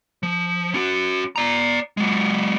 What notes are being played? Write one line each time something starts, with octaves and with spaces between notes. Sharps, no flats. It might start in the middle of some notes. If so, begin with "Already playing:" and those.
F3
C#4 F#4
D5 A#5
F#3 G#3